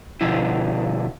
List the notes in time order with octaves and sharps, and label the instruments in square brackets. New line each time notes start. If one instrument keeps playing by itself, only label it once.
[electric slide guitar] B2 D3 F3 E4